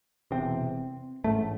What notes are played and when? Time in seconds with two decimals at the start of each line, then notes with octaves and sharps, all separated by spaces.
0.31 E1 E2 C3 C4
1.24 A1 G#2 A3